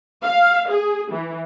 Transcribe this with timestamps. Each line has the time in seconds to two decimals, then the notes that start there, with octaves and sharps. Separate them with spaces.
0.23 F5
0.70 G#4
1.12 E3